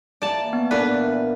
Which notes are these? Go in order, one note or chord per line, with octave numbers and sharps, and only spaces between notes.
E3 A#3 D5 A5
B3
A#2 E3 D4 B4